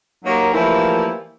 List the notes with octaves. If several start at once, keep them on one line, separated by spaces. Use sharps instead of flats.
F#3 A#3 D#4 G4 A#4 C#5
E3 F3 G3 A3 A#3 E4